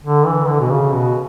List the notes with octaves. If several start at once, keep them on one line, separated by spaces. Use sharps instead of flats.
D3
E3
D3
B2
C#3
B2